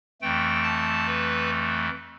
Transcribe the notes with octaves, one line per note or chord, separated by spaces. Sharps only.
F2 E3 A3 G5
A5
B4